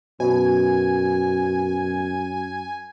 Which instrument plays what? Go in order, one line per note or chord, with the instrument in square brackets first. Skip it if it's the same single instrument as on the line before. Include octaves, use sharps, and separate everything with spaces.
[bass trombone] F#2 [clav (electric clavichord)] B2 [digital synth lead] G#5